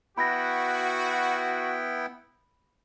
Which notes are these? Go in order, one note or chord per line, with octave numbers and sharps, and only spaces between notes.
B3 E4 F#4 G5 B5 A#6